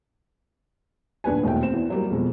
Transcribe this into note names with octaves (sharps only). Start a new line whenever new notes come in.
D#1 D4 B4 G#5
E1 D#2 A3 F#4 G5
C4 E7
E2
F#3 G3 A#3
F2 B2 G#3